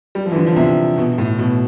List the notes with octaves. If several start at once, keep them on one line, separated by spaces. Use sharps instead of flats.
G3
F3
E3
D3
F3
C3
B2
A2
B2